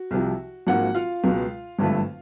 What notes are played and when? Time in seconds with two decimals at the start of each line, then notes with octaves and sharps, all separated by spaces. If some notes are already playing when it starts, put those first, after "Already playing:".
Already playing: F#4
0.11 C2 C3 F3
0.67 G#1 G#2 F3 A#3 F#4 F#5
0.95 F4 F5
1.24 C#2 B2 G#3
1.79 G#1 G2 D3 F3 A3